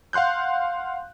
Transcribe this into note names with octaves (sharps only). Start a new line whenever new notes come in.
F5 F#5 C6 F#6 G6